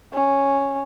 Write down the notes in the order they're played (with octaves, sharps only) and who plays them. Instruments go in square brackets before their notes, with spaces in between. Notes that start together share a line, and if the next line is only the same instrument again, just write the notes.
[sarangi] C#4